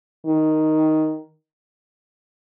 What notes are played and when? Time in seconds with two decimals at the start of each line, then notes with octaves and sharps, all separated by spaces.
0.26 D#3